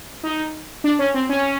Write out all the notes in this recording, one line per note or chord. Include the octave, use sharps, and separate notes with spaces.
D#4
D4
C#4
C4
C#4